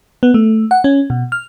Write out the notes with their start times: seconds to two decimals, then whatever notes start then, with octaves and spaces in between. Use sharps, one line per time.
0.23 B3
0.34 A3
0.71 F#5
0.84 C#4
1.10 B2
1.32 F6